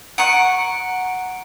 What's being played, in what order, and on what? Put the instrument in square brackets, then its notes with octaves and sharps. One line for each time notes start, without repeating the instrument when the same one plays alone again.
[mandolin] F#5 C#6 [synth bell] A#5 C#7 D7